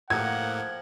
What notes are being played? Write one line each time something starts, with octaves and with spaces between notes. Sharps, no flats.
A2 F3 A#3 D#4 G4 F#5 G#6